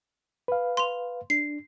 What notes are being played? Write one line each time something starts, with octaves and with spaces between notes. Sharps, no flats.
B4 F5
C6 F7
D4 C7